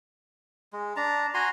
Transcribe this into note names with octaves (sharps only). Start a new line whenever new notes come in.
G#3
D4 A5 A#5
F#4 G#5 A#5 C6